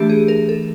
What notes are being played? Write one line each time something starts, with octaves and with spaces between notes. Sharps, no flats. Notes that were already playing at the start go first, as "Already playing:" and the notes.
Already playing: E3 A3 D4 G4
G#4
A#4
A4